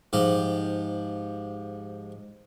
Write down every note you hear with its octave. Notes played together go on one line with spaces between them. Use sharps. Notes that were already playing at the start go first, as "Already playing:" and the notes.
G#2 F3 G4